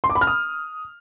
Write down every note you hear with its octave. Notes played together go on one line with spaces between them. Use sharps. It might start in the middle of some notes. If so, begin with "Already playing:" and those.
C6
D6
B5
F6
D#6